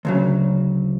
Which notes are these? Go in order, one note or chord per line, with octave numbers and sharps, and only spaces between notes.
D2 C#3 F#3